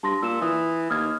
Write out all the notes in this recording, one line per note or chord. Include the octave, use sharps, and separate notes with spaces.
G2 A5 C6 A#6
A#2 E6 E7
E3 D#6
D#2 D#6 F6 G#6